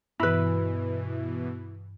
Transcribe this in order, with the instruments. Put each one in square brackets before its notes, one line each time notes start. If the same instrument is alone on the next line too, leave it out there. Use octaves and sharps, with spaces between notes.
[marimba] G2 [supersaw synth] B2 E3 [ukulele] E4 B4